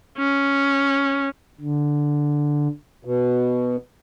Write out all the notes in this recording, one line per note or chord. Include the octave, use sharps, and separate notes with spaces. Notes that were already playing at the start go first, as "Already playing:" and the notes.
C#4
D3
B2